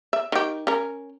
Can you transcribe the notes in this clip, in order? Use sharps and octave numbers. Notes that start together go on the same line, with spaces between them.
E5
D#3 G4
C#4 A#4